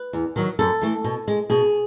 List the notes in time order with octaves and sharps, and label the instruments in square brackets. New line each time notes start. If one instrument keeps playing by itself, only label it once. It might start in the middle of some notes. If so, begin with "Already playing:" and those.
Already playing: [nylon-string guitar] B4
E2
D#3 F#3
F#2 A4
E3 A3
B2
G#3
B2 G#4